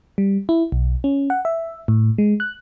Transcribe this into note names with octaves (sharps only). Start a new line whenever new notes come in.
G3
E4
B1
C#4
F#5
E5
A2
G#3
F#6